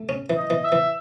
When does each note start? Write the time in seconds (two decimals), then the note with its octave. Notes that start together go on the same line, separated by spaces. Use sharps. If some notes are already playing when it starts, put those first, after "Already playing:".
Already playing: A3
0.09 C#4
0.30 E3
0.37 D#5
0.50 E3
0.65 E5
0.72 E3